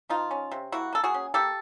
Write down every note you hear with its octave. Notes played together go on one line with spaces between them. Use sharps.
F3 D#4 F4
C#4
C3
A#3 E4 F#4
A#3 A4
F#4 G#4
C#4
A#3 G4 A4